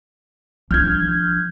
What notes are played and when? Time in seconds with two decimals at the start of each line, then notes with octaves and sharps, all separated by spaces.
0.71 F3 D4 F6 G6 G#6